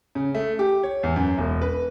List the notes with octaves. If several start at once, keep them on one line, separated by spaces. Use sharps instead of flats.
C#3
A3
G4
C#5
E2
F#2
E1
B4